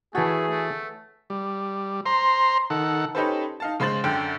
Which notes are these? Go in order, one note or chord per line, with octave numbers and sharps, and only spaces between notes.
E3 A3 B3 F#4 G#4 A4 C#5
A3
G3
C5 A#5 C6
D#3 A4 F#5
C#4 D#4 G4 A4 B4 C5
D#4 F5 A5
C#3 G#3 C5 C6 A6 F#7
F#2 D3 G5